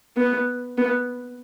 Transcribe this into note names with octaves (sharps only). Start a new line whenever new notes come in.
B3
B3